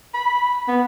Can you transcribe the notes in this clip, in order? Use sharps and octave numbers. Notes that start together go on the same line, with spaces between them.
B5
B3